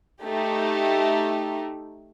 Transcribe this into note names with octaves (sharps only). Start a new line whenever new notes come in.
A3 D#4 G4